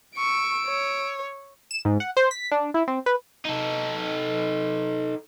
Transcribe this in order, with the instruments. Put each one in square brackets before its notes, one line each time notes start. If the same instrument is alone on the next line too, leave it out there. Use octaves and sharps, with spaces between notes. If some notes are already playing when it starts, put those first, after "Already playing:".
[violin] C#6 [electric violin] E6 D7
[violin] C#5
[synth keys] E7
G#2
F#5
C5
B6
D4
E4
C4
B4
[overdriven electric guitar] D#4 A4